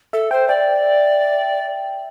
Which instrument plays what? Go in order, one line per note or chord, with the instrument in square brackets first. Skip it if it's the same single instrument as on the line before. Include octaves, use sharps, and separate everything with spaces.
[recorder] A4 [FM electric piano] E5
[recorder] C5 [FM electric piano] G5
[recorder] D5 [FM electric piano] G5